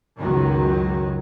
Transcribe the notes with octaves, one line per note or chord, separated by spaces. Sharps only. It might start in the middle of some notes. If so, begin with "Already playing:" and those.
C#2 F#2 D#3 F#3